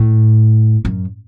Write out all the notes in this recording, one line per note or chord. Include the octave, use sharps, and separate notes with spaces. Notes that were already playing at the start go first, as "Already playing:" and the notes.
Already playing: A2
F#2